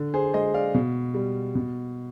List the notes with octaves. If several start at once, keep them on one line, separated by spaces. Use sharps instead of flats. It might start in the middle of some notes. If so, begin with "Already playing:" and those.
Already playing: D3
G#4 C5
G#3 C5 D#5
D5 F5
B2
G3
B2